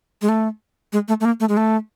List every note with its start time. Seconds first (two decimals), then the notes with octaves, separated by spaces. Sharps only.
0.22 G#3
0.28 A3
0.93 G#3
1.08 A3
1.20 A3
1.25 A#3
1.40 A3
1.49 G#3
1.57 A3